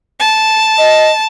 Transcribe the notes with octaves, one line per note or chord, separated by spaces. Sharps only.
A5
D#5